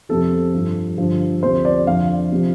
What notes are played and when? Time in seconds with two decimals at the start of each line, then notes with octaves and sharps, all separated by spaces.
0.09 F2 C3 F3 A4
0.54 G2 F3
0.98 G2 D3 F3
1.43 D2 C3 F3 C5
1.65 D5
1.87 F2 D3 F3 F5
2.32 C3 F3